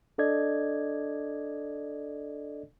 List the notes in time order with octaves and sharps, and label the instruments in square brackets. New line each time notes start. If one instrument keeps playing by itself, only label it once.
[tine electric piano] D4 A4 D5 D#5 G#6